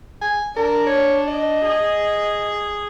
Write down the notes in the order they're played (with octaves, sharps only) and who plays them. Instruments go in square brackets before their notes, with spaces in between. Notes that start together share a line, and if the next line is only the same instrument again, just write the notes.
[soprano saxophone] G#5
[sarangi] D4 [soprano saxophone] A#4
[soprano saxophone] C#5
D#5
[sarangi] G#4